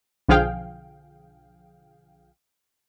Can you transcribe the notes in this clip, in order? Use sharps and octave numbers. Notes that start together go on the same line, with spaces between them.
B1 D3 F3 G#4 F5 G5